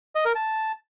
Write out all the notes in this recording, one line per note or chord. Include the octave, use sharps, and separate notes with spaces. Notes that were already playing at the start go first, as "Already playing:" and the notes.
D#5
A#4
A5